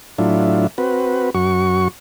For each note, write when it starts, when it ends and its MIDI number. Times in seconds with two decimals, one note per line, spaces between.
0.18 0.67 45
0.18 0.67 54
0.18 0.67 62
0.18 0.67 64
0.18 0.67 65
0.78 1.30 60
0.78 1.30 66
0.78 1.30 71
1.35 1.88 42
1.35 1.88 66
1.35 1.88 85